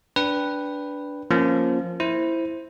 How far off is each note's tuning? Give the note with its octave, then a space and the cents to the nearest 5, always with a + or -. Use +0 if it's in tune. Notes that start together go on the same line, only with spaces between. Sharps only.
D4 -15 B4 +0 G5 +0
F3 +0 A#3 +0 C#4 -10
E4 +0 C5 +0